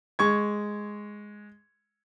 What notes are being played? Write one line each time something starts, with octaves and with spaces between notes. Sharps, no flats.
G#3 C#6 G#6